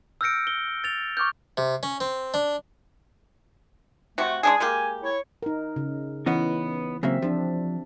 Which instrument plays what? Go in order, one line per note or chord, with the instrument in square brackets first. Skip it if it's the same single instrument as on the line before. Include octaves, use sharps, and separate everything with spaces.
[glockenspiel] E6 F6 G6 A#6 C#7 D7
G7
A6 F7
C#6 D6 F6 G6
[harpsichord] C3
C#4
C4
D4
[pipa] C3 F#4 [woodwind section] A3
[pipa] G#3 D4 G#4 [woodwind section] G#5
[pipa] G#3 A#3 G4
[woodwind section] E4 C#5
[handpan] D#4 A#4
C#3
[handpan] E3 [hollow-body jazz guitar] B3 C#4 D#4
[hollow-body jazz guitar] C#3 F#3 A#3 [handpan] C4 E5
[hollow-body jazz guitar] F3 [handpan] D4 G4